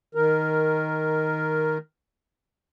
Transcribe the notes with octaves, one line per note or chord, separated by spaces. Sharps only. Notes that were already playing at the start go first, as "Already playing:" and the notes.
D#3 A#4